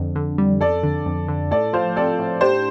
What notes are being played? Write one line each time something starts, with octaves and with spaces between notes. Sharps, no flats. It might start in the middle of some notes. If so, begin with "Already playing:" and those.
Already playing: F2 D3
D3
G3
F2 A4 D5
D3
F2
D3
A2 A4 D5
F3 C5 F5
C4 A4 D5
A2
D4 G4 C5